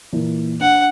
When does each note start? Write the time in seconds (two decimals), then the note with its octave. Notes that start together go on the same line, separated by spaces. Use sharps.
0.13 A#2 E3 A#3
0.61 D4 F#5